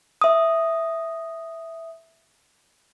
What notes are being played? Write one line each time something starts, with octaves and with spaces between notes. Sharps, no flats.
E5 D#6